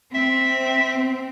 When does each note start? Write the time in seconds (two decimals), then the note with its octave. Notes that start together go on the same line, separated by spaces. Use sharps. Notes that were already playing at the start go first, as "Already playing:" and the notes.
0.15 C4 E5